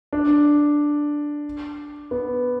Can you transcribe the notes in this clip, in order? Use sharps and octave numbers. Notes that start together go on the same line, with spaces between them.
D4
B3